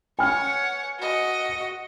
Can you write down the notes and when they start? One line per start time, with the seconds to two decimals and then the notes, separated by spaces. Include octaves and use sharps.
0.19 C#5 F#5 G#5 F6
0.99 F#4 D#5